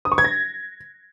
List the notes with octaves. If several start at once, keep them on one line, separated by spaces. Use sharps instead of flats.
D#6
C#6
G#6
A#6